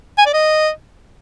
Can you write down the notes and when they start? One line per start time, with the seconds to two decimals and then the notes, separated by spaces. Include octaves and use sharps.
0.18 G#5
0.26 D5
0.33 D#5